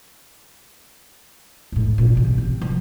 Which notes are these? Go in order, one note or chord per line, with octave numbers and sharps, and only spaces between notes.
G#1 A2
A#2
A1 C3
C4
F3